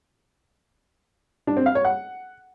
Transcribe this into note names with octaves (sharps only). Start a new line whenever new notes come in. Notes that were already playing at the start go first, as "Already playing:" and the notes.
D4
C4
F5
C#5
F#5